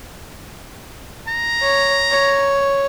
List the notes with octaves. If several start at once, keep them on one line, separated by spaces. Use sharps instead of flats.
A#5
C#5
C#5